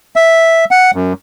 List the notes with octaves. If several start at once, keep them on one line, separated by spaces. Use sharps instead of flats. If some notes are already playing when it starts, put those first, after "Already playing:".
E5
F#5
F#2